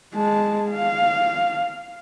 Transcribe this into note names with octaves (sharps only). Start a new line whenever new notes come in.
G#3 A5
F5